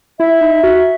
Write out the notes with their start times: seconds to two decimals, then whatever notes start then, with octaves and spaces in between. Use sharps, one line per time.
0.20 E4 E5
0.41 D#4
0.63 F#4